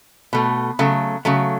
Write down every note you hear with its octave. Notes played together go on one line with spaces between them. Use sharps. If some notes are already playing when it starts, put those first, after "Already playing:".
B2 A3
C#3 F#3 A3
C#3 F#3 A3